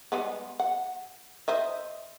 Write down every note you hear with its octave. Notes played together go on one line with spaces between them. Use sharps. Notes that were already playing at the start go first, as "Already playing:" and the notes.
G3 G#3 B3
F#5
C5 D#5 E5